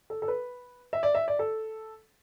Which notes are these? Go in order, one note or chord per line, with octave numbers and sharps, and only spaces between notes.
A4
A4
B4
E5
D5
E5
D5
A4